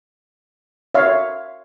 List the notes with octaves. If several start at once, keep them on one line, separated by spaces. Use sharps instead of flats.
C#5 E5 F5